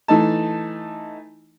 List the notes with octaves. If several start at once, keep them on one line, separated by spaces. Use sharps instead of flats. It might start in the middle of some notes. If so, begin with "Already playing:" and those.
E3 A3 D#4 A5